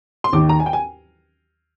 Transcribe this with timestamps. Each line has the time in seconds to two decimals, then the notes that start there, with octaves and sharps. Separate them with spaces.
0.24 C6
0.33 D#2 D#3 D6
0.49 A#5
0.60 G#5
0.66 G5
0.73 G#5